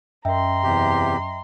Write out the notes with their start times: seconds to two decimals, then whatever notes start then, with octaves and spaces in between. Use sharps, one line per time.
0.25 F#2 D#5 E5 G5 A#5 C6
0.63 E2 C3 G4